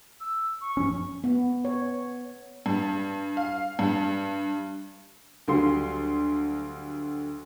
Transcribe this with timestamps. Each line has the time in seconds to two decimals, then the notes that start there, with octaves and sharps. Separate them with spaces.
0.20 E6
0.61 C#6
0.77 G2 F3 C#4
1.24 B3
1.65 C#5
2.66 G2
3.37 F5
3.79 G2
5.48 D2 F#3 G3 A4 F5 C6